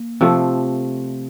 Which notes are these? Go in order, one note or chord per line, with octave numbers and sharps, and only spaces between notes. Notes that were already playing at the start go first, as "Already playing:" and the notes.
Already playing: A#3
C3 F3 A3